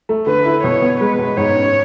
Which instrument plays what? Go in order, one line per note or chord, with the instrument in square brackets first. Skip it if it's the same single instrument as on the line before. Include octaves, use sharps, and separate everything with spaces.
[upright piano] A3
[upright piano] D3 [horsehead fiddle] B4
[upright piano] E4
[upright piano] B2 [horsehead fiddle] C#5
[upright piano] B3
[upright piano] G#3 [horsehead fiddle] B4
[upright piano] B2
[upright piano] G#2 [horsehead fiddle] C#5
[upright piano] C#4